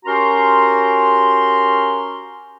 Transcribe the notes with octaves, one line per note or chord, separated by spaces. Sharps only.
C#4 F#4 G4 A#4 A#5 C6